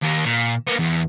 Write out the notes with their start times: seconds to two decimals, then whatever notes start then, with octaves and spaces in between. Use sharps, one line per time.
0.02 D#2 A#3
0.25 A#2
0.67 A#3 B3
0.79 E2